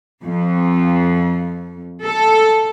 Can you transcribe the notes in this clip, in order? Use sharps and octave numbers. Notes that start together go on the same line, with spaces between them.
F2
A4